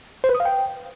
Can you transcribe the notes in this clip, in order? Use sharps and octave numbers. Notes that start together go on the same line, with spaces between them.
C5
B4
D#6
F5
G5